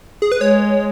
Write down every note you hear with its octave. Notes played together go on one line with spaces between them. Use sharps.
G#4
B4
G#3 C#5